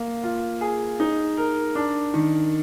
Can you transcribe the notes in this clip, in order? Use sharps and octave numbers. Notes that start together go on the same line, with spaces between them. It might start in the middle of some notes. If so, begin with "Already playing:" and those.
Already playing: A#3
F4
G#4
D#4
A#4
D4
D#3